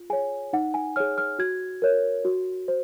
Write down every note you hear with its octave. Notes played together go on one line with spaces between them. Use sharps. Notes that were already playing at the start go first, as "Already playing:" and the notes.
Already playing: F4
G#4 C#5 G#5
D#4 F#5
G#5
G#4 C#5 F6
F6
F#4 G#6
A#4 C#5
F#4
C5